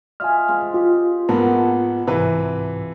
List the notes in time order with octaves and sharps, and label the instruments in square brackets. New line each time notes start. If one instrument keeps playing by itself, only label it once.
[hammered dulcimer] F4 D#5 E5 [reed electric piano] G#5 F6
[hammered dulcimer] G#3 C4 F4
[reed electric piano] F4 [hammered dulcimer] G4 G#4
[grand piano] G#2 A#3 B3 [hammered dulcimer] A4 F#5 B5
[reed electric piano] C2 G#2 [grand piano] C3 E3 B4